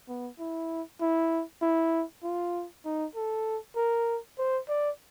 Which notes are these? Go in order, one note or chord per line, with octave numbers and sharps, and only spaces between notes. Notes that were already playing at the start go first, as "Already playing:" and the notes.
B3
E4
E4
E4
F4
D#4
A4
A#4
C5
D5